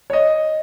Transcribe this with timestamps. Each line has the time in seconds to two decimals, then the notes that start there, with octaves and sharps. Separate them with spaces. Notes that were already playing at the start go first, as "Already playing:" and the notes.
0.10 C#5
0.13 D#5